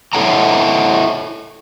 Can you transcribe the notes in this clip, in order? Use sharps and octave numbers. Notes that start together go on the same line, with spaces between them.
E4 A4 C#5 F#5 G5 A#5